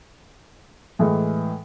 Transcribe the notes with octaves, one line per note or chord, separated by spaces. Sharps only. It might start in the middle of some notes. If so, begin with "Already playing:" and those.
A2 E3 G#3